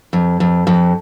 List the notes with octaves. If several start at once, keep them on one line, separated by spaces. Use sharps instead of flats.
F2
F2
F2